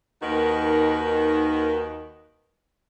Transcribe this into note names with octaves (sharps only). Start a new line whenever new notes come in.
D#2 D#3 D#4 F#4 A#4 B4